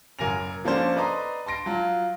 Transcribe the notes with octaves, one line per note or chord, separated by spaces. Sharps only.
F#1 A#4 G#5 A#6 F7
F3 A#3 C#4 D4 A4 C5
B4 D5 D#5 A#5 C6
A5 C6 A#6 D7
F#3 F4